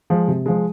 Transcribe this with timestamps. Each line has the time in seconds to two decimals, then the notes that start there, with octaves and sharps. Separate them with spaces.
0.10 F3 G#3
0.28 C3
0.46 F3 G#3